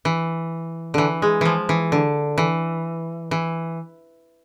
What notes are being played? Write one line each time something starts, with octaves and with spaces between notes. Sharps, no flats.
E3
D3 E3
G#3
E3 F3
E3
D3
E3
E3